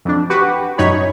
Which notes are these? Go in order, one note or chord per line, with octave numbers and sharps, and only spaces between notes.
F2 D4
F#4 G4 B4
F#2 D#4 C#5 B5